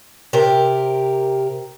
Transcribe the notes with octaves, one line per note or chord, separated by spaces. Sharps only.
C3 G4 A#4